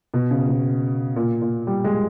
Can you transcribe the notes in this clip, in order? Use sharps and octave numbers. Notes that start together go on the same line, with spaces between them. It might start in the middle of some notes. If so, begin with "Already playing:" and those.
B2
C#3
B2
A#2
A#2
G3
G#3